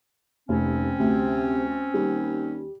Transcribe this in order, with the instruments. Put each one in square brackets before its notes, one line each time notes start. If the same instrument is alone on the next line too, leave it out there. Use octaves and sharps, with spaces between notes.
[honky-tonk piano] F1 [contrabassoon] D#2 [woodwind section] C4 C#4
[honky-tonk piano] D2 [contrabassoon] C3
[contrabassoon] D#2 [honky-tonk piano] G3